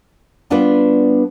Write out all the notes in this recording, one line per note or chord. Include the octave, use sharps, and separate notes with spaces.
G3 B3 D4 F4 B4 D5